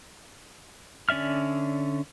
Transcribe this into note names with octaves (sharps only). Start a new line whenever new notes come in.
D3 C#4 D5 E5 F6